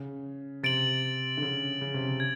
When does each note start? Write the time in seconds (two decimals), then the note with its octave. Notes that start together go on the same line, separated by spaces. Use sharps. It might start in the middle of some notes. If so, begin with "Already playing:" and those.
Already playing: C#3
0.63 C3 A6 D7 F#7
1.37 D3
1.42 C#3
1.81 C#3
1.94 C3
2.07 C#3
2.20 G#6